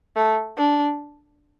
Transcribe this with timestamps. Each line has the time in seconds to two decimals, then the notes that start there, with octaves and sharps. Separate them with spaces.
0.16 A3
0.57 D4